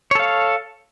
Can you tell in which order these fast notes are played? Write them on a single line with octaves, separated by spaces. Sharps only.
C#5 A4 F5